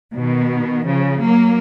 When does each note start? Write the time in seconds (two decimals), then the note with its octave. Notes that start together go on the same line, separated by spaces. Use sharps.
0.13 B2 D#3
0.85 C#3 F3
1.21 F#3 A#3